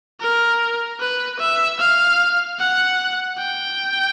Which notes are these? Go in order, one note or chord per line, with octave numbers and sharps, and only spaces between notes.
A#4
B4
E5
F5
F#5
G5